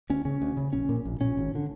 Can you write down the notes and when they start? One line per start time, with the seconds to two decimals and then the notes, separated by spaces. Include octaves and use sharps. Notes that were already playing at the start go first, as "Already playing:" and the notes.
0.10 D2 C#4
0.25 C#3 C#4
0.42 D2
0.57 C#3
0.73 A#1 C#4
0.89 A#2
1.05 A#1
1.21 A#2 C#4
1.37 G#1
1.55 D3